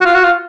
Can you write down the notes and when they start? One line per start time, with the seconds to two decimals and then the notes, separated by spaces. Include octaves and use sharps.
0.01 F#4
0.06 F4
0.15 F#4
0.24 F4